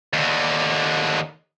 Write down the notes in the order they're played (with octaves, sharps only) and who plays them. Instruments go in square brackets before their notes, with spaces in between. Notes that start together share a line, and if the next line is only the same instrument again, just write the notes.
[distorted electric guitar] D#2 D3